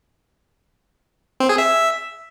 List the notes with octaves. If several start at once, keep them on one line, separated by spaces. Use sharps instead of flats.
C4
G#4
E5